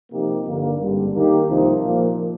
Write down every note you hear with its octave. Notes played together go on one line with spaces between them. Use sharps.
C3 F3 A#3 D#4 G4
G2 D3 G3 A#3
G#1 G2 D3 G3
D#2 D#3 A#3 D#4 G4
C2 C3 F3 A#3 D#4
A#2 F3 A#3